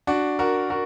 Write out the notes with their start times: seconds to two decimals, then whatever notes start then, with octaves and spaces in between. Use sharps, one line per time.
0.07 D4 F#4
0.39 F#4 A#4
0.70 F#4 A#4